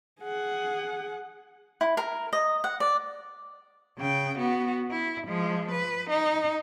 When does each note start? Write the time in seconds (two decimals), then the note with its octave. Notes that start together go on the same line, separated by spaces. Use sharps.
0.21 G#4 F#5
1.81 E4
1.97 A#4
2.33 D#5
2.64 F#5
2.80 D5
3.98 C#3 G5
4.38 B3 F#4
4.91 E4
5.28 F3 G#3
5.71 B4
6.10 D#4